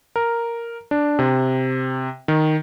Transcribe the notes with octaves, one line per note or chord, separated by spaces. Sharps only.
A#4
D4
C3
D#3